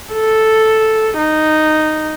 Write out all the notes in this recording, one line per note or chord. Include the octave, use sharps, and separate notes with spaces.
A4
D#4